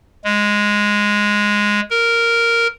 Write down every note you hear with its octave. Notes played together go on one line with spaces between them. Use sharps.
G#3
A#4